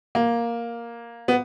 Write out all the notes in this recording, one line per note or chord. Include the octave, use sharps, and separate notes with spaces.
A#3
B3